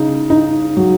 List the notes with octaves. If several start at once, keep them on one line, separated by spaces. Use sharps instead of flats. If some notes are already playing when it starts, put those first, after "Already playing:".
Already playing: C#3 D#4
D#4
F#3